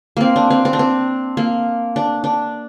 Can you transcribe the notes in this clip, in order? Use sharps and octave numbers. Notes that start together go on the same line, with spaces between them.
A#3 C4
D4
C4
C4
D4
C4
A#3
D4
D4